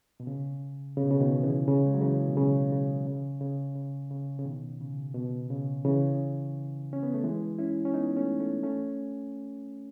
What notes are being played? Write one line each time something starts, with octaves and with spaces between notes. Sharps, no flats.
B2
C#3
C#3
B2
C#3
B2 D#3
C#3 E3
C#3
G#3
F#3
C#3 E3
B2
C#3
C#3
C#3
C#3
C#3
C#3
C#3
B2 D#3
C#3
B2
C#3
C#3 E3
C#4
B3
A3
E3 G#3
C#4 E4
C#4
B3 D#4
A3 C#4
A3 C#4
A3 C#4